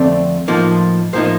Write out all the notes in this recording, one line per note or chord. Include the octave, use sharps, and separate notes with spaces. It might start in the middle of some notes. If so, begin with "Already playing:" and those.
Already playing: F2 D3 A3 C4 D5
A2 F3 A#3 D#4
A2 F3 A#3 D#4 C5